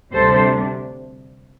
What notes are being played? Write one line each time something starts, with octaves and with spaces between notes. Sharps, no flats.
D2 C3 G3 D4 A4 C5